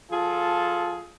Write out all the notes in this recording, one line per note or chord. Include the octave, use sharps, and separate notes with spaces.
F3 F4 G#4 A4